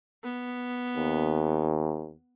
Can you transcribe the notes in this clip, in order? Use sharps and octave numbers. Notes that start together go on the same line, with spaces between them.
B3
D#2